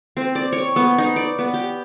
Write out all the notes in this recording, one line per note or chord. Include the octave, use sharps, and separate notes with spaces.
C4
D5
C#5
B3
D#4
D5
B3
G4